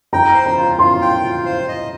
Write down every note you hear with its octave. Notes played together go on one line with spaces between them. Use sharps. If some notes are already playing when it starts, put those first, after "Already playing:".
G5 A#5
C5
A#5
F4
F4 C6
G5
F4
C5
D#5